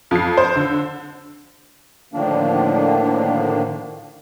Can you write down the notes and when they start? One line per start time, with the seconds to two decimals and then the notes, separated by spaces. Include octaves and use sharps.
0.11 F2 C7
0.37 C5
0.56 D3
2.13 A2 D3 D#3 F3 A#3 D4